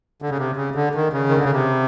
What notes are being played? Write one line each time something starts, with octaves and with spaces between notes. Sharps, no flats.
D3
C#3
C3
C#3
D3
D#3
C#3
D#3
D3
C#3
C3